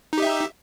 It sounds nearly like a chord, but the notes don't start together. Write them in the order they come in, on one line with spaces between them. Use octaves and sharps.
D#4 G4 E5